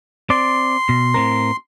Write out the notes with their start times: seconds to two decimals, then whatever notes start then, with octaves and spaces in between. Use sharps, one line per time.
0.30 C4 D5 C6
0.89 B2
1.14 A2 C4 A#4